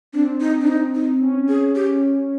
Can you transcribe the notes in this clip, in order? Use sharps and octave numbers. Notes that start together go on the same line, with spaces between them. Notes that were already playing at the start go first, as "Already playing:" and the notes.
C4 D4
D#4
D4
D#4
D#4
C#4
G#4
G4